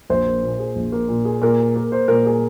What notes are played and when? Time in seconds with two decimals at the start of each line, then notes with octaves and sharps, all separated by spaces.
0.10 A#1 C5
0.27 A#3
0.43 A#2
0.59 G#4
0.76 A#1
0.92 A#3
1.08 A#2
1.25 G#4
1.42 A#2 A#4
1.59 G#4
1.76 A#3
1.92 C5
2.08 A#2 A#4
2.26 G#4